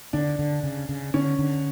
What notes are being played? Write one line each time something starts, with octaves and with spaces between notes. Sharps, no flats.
D3 D4
D3
C#3
C#3
D3 C#4
D3